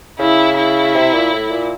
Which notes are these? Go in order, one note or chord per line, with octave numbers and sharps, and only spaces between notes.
C#3 E4
E4
C3
A#2
A2
A#2